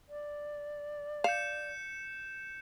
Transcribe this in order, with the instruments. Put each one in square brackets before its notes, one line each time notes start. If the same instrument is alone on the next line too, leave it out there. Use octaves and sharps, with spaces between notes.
[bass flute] D5
[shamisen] F5 [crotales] G6 C#7 E7